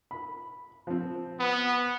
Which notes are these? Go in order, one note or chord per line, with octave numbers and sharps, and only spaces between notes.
B5
F3 C4
B3